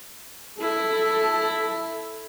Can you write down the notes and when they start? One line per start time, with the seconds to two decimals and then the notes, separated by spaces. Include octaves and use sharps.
0.61 E4 A4